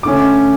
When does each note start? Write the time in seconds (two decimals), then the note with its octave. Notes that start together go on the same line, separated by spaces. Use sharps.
0.03 D3 A3 C#4 D6